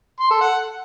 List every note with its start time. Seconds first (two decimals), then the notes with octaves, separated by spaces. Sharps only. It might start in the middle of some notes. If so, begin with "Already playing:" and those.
0.20 C6
0.30 A4
0.41 F#5